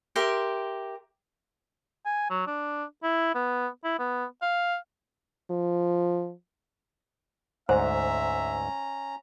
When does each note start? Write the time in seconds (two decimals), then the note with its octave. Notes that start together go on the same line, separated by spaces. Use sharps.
0.16 G4 A#4 E5 C6
2.06 G#5
2.30 F#3
2.47 D4
3.03 E4
3.35 B3
3.84 E4
3.99 B3
4.42 F5
5.51 F3
7.69 D2 G#2 C#4 C5 E5 A#5